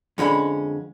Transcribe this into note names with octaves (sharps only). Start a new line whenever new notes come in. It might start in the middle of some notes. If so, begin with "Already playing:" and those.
F2 D3 G#3 C#4 B5